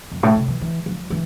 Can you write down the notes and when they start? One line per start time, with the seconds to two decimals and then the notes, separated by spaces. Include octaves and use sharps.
0.12 F2
0.23 A2
0.36 C3
0.48 E3
0.61 E3
0.86 F3
1.10 E3